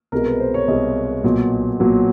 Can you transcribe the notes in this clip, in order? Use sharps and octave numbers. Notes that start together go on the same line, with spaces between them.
C2 B2 G#3 A#4
B4
C5
C#5
C2 B2 G#3 D#5
B1 A#2 F#3
B1 A#2 F#3